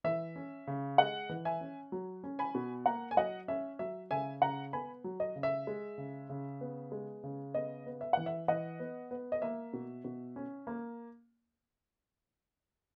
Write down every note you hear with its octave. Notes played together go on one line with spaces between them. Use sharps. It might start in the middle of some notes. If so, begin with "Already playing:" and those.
E3 E5
C#4
C#3
G#3 D#5 F#5
E3
E5 G#5
C#4
F#3
C#4
G#5 B5
B2
A#3 F#5 A#5
G#5
F#3 D#5 F#5
C#4 E5
F#3 E5
C#3 E5 G#5
C#3 F#5 A#5
B3 G#5 B5
F#3
D#5
C#3
E5
G#3
C#3
C#3
B3
G#3
C#3
B3 D#5
B3
E5
E3 F#5
E5
E3 D#5 F#5
B3
B3
D#5
A#3 E5
B2
B2
C#4
A#3